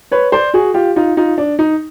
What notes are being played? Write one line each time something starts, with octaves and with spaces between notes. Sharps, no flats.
B4 C#5
C5 D5
F#4 G#4
F4 G4
D#4 F4
D#4 F4
D4
D#4